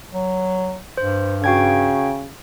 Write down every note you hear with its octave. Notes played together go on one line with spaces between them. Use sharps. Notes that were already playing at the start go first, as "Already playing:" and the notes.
F#3
G2 C5
C#3 F#4 G5 G#6